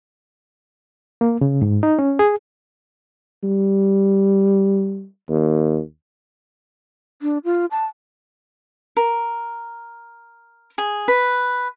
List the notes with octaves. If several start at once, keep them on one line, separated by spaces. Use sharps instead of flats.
A#3
C#3
G#2
D#4
C#4
G#4
G3
D#2
D4
F4
A5
A#4
G#4
B4